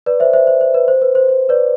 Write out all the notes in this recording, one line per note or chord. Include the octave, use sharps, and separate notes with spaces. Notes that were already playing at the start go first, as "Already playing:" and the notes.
B4 D5
C5 E5
C5 E5
C5
C5
B4
C5
B4
C5
C5
B4 D5